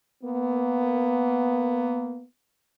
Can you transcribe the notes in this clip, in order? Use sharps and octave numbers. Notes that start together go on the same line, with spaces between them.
A#3 B3